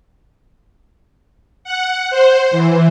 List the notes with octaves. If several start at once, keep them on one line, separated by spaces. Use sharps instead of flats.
F#5
C5
E3